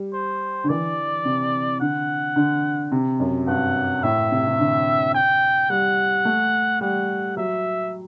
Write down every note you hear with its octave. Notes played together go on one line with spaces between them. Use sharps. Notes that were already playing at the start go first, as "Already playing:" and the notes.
Already playing: G3
C5
D3
E3 D5
C3
D3 F#5
D3
C3
F#2
G2 F#5
A2 E5
C3
C3
D3
G5
G3 F#5
A3
G3 F#5
F#3 E5